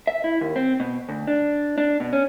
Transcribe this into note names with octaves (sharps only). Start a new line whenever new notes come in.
E5
E4
D#2
C4
B2
D2
D4
D4
B2
C#4